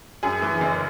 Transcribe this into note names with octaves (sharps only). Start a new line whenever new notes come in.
F#2 G#4
E3
F#1